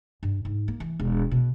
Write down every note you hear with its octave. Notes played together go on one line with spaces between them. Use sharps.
G2
G#2
A#3
E3
E1
B2